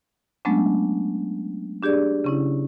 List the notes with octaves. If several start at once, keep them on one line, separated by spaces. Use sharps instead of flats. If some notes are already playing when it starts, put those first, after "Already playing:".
F#3 G#3 A3 B3 C#4 D4
D4 G4 G#4 D5
C#3 C#4 E4